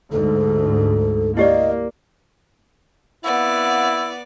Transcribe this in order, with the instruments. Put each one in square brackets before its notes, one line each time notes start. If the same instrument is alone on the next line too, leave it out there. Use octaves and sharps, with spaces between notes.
[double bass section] D2 G#2 [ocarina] A4
[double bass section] A#3 [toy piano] E4 G4 D5 [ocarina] D#5
[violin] B3 D5 [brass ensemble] C4 F5 F#5 [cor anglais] E4